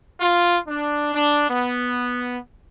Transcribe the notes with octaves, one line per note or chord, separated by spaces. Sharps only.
F4
D4
D4
B3